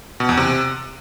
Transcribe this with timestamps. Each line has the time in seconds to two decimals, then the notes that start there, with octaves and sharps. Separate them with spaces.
0.20 B2
0.29 E2
0.37 C3